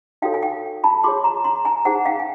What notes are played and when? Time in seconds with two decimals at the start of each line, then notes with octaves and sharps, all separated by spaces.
0.22 D#4 F#4 A4 C#5 F5 G5
0.34 G#5
0.43 F5 G5
0.84 A5 B5
1.04 F4 G#4 C#5 C6 D6
1.24 A#5 C6
1.44 A#5 C6
1.65 G#5 A#5
1.85 D#4 G#4 C5 F#5 G#5
2.06 F5 G5
2.19 G#5